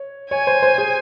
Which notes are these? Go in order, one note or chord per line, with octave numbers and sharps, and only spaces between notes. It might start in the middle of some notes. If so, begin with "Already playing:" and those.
Already playing: C#5
C#5 G#5
C5
C5
G#4